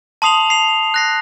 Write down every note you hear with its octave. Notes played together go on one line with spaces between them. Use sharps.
A5 C6 D#6 C7 F7 F#7
C7 F7
F#6 A#6 C7